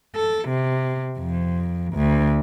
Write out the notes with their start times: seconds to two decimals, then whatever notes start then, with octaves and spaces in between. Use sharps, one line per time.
0.16 A4
0.49 C3
1.19 F2
1.94 D2